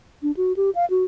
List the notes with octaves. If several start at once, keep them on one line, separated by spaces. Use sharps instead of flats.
D4
F#4
G4
F5
F#4